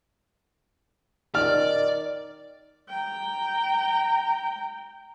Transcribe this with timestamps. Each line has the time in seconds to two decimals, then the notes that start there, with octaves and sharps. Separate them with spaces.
1.35 D#3 D5 F6
2.89 G5 A#5